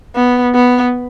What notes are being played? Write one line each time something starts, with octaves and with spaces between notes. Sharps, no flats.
B3
B3